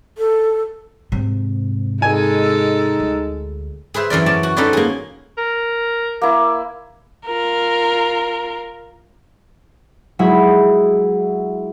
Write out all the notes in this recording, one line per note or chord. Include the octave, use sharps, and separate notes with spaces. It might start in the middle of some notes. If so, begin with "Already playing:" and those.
A4
G#2 C3
G#3 D#4 A4 G#5
D2
G#4 B4 C5 E5
F#2 E3 A#4 D5
C#4 D5 A5
F#4
C#4 D#4 A4 B4 C5 D5
A#3 G#4
A#4
A#3 E4
F4 A#4
F#3 G#3 E4